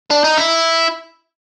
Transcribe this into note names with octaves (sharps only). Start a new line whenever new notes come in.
D4
D#4
E4